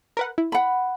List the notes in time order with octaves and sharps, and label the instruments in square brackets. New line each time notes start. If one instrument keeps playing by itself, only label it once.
[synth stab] A#4 B4 F#5
E4
[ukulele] F#5 B5